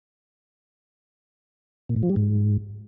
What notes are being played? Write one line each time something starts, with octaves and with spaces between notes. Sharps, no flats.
A#2
A2
F3
G3
G#2